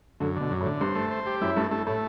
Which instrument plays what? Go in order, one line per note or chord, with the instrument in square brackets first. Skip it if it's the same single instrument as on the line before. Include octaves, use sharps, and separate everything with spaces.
[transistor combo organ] F#2 [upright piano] D3
[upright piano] B2 [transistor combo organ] D3
[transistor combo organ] F#2
[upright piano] A2
[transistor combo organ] D3
[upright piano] G2 [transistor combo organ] C5
[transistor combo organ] A3
C5
G4
[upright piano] F#2 [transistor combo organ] E4
[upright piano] G2 [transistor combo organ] A3
[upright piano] G2 [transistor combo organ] A3
[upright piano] A2 [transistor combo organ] A3